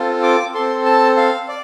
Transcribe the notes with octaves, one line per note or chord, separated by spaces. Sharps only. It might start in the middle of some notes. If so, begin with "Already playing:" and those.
Already playing: C4 F4 A4
D6
C4 A4 C6
A5
F5
D5